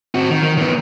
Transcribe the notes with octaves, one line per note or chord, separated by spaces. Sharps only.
C4 F#4
D#3
D#3
D#3 B3